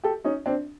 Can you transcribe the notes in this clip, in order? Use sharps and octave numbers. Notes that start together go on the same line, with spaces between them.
G4 A4
C#4 D#4
C4 D4